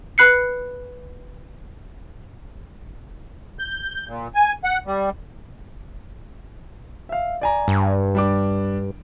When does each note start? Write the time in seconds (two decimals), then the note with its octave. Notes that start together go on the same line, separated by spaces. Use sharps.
0.18 B4 B5 F#6 C7 C#7
3.59 G6
4.08 A#2
4.35 G#5
4.64 F#5
4.87 G3
7.09 E5 F5
7.42 D5 G#5 A#5
7.68 G2
8.15 G3 D4 D6